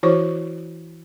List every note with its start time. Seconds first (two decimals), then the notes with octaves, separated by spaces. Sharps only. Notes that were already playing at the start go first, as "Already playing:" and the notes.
0.03 E3 E4 F#4 C5 C#5 C#6